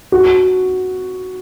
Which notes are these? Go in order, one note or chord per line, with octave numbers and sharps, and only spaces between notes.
F#4